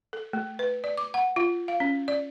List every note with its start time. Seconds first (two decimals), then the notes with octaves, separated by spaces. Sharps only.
0.13 A4
0.33 A3
0.59 B4
0.84 D5
0.98 D6
1.14 F#5
1.36 F4
1.68 F5
1.80 C#4
2.08 D5